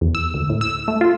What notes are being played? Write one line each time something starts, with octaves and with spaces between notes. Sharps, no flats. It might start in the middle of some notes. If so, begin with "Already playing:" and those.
E2
E6
D2
A2
E6
A3
F4